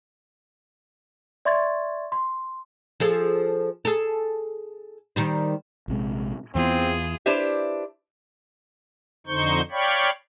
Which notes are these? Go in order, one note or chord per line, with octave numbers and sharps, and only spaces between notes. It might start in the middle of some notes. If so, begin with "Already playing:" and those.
D5 E5 C6 C#6 G#6 A6
C6
F3 G#4 A4
G#4 A4
D#3 G3 C5
A#1 C3 G#3
E2 E3 B3 C4 F4 G#4
D4 E4 G4 B4 C5 E5
F2 D3 D#4 C5 C#6 G6
C#5 D5 F5 G5 B5 C#6